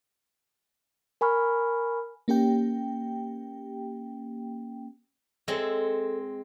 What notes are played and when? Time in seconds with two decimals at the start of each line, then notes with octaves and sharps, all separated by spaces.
1.21 A#4 G#5 B5 C#6 F6
2.28 A#3 C#4 G4 G5
5.48 G#3 C4 A4 C#5 E5